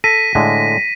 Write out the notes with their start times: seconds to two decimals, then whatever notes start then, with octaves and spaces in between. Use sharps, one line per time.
0.04 A4 A#6 B6 D#7
0.35 A2 D3 G#3